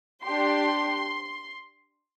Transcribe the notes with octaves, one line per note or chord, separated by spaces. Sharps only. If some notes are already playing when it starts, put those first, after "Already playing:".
D4 G4 C6